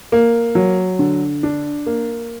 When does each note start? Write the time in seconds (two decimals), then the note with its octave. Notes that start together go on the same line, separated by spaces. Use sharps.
0.12 A#3
0.55 F#3
0.99 D3
1.43 D4
1.86 A#3